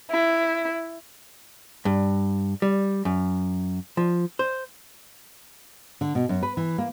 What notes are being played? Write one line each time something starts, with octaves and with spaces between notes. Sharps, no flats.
E4
G2
G3
F#2
F3
C5
D3
B2
F#2
B4
E3
A#3